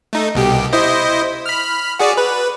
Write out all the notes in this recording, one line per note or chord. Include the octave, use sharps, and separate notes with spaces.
A3 D#4
C2 B2 G4
E4 C5 D#5
B5 F6
F#4 G#4 D5
B4